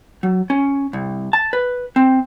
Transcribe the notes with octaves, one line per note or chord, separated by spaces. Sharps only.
F#3
C#4
C2
A5
B4
C4